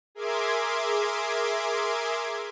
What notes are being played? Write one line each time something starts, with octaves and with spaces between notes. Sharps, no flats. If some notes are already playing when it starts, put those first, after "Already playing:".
G#4 A#4 E5 C6 D6 G#6